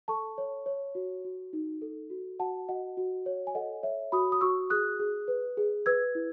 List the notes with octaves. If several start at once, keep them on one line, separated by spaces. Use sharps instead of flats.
A4 A5 C#6
C#5
C#5
F#4
F#4
D#4
A4
F#4
F#4 F#5 A5
F#4 D#5 F#5
F#4
C#5
G#5
A4 D#5 F#5
C#5 E5
F#4 B5 D#6
D#6
F#4 C#6 E6
G#4 D#6 F#6
G#4
B4
G#4
B4 E6 G#6
E4